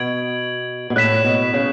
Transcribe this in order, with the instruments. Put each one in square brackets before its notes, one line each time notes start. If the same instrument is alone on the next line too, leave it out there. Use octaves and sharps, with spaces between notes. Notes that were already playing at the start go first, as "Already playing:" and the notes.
Already playing: [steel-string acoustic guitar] B2 [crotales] G#6 D7 F#7
[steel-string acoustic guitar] B2
[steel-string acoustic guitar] A2 [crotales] F#6 B6 E7
[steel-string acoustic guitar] B2
C#3